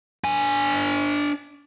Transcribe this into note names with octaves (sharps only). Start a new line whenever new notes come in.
D4 G#5